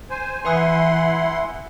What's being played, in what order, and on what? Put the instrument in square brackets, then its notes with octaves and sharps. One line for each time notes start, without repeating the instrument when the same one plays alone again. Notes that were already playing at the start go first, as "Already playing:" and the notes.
[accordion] C5 G#5
[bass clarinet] E3 [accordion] E4 F#5 C6 [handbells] B4 G#5 D#6